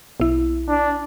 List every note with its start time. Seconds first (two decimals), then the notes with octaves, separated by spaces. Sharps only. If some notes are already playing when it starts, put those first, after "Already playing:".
0.20 B1 E4
0.69 D4